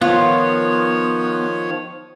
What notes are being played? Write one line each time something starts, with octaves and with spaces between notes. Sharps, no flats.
D#3 F3 B3 F4 C#5